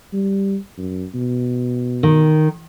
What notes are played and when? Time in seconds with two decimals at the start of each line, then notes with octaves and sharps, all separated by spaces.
0.13 G3
0.78 F#2
1.14 B2
2.03 D#3